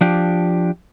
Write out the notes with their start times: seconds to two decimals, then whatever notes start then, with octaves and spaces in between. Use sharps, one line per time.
0.01 F3 D4 G4